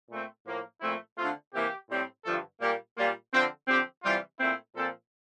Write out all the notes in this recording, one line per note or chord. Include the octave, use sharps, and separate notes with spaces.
A#2 A3 C4
A2 F3 A#3
A#2 F3 A3 C4 E4
D3 A3 C4 F4
C3 E3 A#3 G4
A2 G3 C4
G2 D3 F3 A3 A4
A#2 G3 A#3 G4
A#2 G3 A#3 F4
D3 F3 C4
D3 F3 C4 G4
C3 E3 G3 F4
A#2 A3 C4 E4
A#2 F3 C4 A4